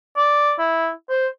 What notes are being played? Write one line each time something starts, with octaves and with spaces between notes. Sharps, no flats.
D5
E4
C5